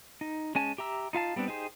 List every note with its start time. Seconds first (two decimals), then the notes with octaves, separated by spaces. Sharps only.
0.21 D#4
0.55 G#3 C#4 G#5 A5
0.78 G4 E5 A#5 E6
1.13 D#4 F4 F5 A5
1.36 G3 B3 C4 D4
1.48 D#4 G4 G#4 C5